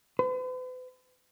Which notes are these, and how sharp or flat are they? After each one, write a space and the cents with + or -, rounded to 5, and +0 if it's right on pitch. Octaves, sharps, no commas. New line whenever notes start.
B4 +45